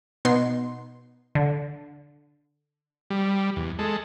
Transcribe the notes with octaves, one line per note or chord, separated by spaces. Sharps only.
B2 B3 D#4 C6
D3
G3
E2
G#3 A4